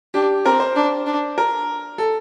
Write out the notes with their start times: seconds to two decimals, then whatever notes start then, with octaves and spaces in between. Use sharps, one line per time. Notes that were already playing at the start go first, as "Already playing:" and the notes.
0.14 D4 G4
0.45 C4 A#4
0.60 C5
0.76 D4
1.06 D4
1.38 A#4
1.98 A4